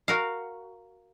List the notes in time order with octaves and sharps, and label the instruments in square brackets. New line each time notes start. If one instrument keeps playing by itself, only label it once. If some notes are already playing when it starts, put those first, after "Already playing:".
[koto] F#4 A#4 F5